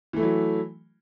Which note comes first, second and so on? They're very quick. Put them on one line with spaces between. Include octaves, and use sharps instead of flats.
E3 A3 E4 F#3